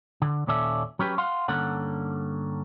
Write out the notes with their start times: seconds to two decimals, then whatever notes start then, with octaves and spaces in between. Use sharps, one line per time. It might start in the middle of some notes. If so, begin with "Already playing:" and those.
0.22 D3
0.47 D#2 A#2 C#4 A4 D5 E5
0.99 F#3 C#4 G4 B4
1.18 F5 F#5 C6
1.48 G2 D3 A#3 C#4 A4 F#5